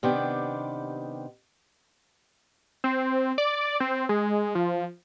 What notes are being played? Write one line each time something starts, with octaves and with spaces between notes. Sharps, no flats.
C3 D#3 B3 D4 G4
C4
D5
C4
G#3
F3